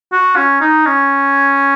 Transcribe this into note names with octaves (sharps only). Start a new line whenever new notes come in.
F#4
C#4
D#4
C#4